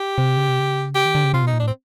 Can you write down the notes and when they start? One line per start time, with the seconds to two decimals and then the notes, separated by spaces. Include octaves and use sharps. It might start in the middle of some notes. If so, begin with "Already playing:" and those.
Already playing: G4
0.18 C3
0.37 C#3
0.49 C3
0.60 C#3
0.95 G4
1.05 D#3
1.15 D3
1.24 C#3
1.34 C3 F4
1.43 B2
1.47 D#4
1.53 A#2
1.60 A2 D4
1.67 C4